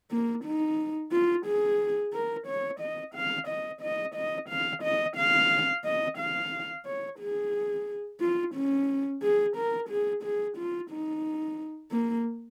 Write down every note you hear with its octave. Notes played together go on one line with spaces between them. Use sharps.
A#3
D#4
F4
G#4
A#4
C#5
D#5
F5
D#5
D#5
D#5
F5
D#5
F5
D#5
F5
C#5
G#4
F4
C#4
G#4
A#4
G#4
G#4
F4
D#4
A#3